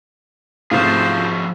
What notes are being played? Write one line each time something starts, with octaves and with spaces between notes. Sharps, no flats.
G#2 C3 F3 A3 F4 F#4 G#4 C5